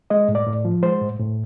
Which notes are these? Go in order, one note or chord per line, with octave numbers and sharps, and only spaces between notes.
G#3 D#5
A2
D5
A2
F3
G#3 C5
A2
A2